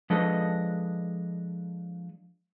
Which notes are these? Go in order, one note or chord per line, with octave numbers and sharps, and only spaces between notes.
F3 G#3 D4 A4 B4 D#5